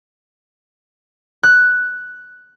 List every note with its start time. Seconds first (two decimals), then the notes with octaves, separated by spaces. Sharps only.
1.43 F#6